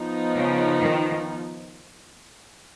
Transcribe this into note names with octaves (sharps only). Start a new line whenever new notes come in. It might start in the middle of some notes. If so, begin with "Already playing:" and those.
Already playing: F3 B3 D#4
C#3
D#3